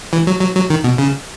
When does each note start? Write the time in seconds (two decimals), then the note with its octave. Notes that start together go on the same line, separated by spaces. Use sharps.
0.13 E3
0.27 F#3
0.41 F#3
0.56 F#3
0.70 D#3
0.84 B2
0.98 C#3